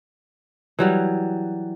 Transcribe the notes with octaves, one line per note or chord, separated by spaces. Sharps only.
E3 F#3 G3